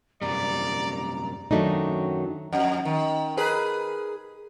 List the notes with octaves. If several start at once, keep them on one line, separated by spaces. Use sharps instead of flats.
F#2 C3 G3 D5 A#5
F#2 D#3 F#3 A3 D4 D#4
F2
D#3
G#4 A#4 B4